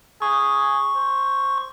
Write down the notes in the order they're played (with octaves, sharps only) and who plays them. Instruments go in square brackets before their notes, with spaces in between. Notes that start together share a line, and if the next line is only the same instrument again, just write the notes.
[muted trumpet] G#4 [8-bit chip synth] C#6
[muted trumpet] C5